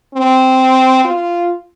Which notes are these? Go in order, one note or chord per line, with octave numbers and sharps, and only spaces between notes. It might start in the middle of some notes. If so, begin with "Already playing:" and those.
C4
F4